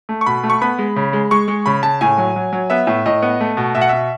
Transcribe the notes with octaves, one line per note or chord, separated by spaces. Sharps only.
A3
C#6
B2 B5
A3
C#6
B3 B5
G#3
C#3
G#3
G#3 C#6
G#3
C#3 B5
C#3 A5
A2 G#5
F#3
F#3
F#3
B3 E5
A2
A2 D#5
B3
A3
B2
B2 E5
F#5
B2 E5